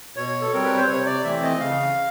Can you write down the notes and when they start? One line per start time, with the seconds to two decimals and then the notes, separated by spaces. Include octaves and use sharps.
0.16 B2 C#5
0.41 A4
0.53 G3 C4 A#4
0.65 B4
0.76 C5
0.88 C3 C#5
1.06 D5
1.24 E3 A3 C4 E5
1.42 D#5
1.60 C#3 F5